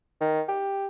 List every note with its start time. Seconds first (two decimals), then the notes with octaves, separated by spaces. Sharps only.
0.21 D#3
0.48 G4